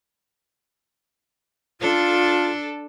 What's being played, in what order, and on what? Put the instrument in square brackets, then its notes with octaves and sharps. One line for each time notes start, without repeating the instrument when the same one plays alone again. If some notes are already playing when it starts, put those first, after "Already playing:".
[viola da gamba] D4 A4 [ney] F4